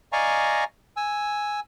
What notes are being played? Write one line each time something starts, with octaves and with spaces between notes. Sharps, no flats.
D5 D#5 F5 G#5 A#5 C#6
G#5 E6